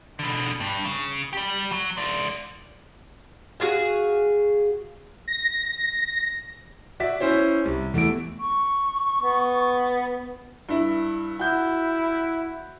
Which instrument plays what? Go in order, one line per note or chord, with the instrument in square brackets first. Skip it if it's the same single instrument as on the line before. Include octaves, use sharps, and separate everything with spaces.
[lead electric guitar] B2 D3
G2
C#3
G3 G4
F#3
G#3 D5
[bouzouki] F#4 G#4 F5
[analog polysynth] A#6
[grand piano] F#4 D5 E5 B6
C#4 E4 C5 C#5
C2
E2 A3 E4 D7
[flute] C#6
[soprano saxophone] B3
[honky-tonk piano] G2 E4
[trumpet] E4 [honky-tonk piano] F#4 G6